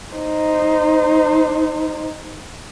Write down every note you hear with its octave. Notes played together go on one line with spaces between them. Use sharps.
D#4 C5